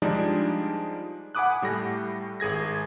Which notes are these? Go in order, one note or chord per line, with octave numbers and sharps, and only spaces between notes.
F3 G3 G#3 D4 D#4
F#5 G#5 B5 D6 D#6 F#6
A2 G3 A3 A#6
G#1 G#4 G#6 A#6